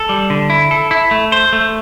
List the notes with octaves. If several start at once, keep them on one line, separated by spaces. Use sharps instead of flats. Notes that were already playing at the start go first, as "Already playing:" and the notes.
Already playing: A4
G3
D3
E4
A4
E4
A3
C5
A3